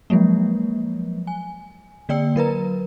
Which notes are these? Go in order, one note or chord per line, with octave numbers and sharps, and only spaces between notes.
F3 F#3 G#3 A#3
G#5
D3 A#3 D5 G5 E6 C#7
F#3 A#4 B4 A#5